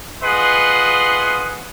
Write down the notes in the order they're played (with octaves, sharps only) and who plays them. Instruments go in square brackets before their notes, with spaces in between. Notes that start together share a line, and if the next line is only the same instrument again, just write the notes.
[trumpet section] F4 G#4 B4 D#5 F#5 C6